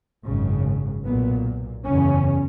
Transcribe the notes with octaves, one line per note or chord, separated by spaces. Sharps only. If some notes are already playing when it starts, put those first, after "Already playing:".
G#1 F#2 C#3
B1 A#2 B3
F#1 E2 C#3 C#4